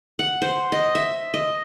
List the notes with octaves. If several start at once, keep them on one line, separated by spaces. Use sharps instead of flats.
F#5
C5
D#5
E5
D#5